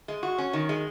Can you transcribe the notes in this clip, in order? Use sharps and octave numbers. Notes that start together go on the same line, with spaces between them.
G#3
F#4
C#4
D#3
G#3